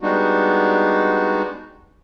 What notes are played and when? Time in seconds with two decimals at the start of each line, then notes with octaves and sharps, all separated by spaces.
0.01 G3 G#3 B3 D4 D#4 F#4